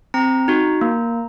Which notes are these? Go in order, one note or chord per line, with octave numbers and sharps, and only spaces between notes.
C4 A#5
D#4 F#4
A#3